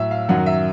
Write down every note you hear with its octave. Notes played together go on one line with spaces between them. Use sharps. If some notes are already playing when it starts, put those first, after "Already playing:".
Already playing: A2 F#3 E5
F5
F#2 D#3 F#3 F#5
E5